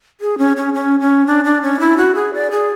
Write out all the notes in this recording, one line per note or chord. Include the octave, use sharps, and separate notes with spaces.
G#4
C#4
C#4
C#4
C#4
D4
D4
C#4
E4
F#4
G#4
D5
G#4